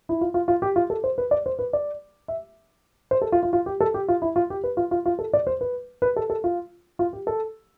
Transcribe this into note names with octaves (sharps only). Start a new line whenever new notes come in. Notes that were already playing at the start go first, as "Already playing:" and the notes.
E4
F4
F4
F4
G4
F4
A4
C5
B4
D5
C5
B4
D5
E5
C5
A4
F4
F4
F4
G4
A4
G4
F4
E4
F4
G4
B4
F4
F4
F4
A4
D5
C5
B4
B4
A4
A4
F4
F4
G4
A4